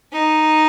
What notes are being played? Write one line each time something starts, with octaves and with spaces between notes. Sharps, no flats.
D#4